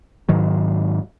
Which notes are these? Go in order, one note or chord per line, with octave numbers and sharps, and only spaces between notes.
G#2 D#3 F#3